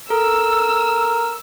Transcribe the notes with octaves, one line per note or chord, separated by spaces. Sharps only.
A4 A#4 E6